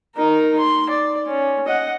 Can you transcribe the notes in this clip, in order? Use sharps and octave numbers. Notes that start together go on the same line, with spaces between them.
D#4 A#4
C6
D5
C#4
D#5 F#5